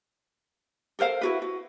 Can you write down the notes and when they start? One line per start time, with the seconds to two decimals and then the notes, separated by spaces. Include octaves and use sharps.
0.99 A4 A#4 C5 F5
1.21 E4 F#4 B4
1.42 F#4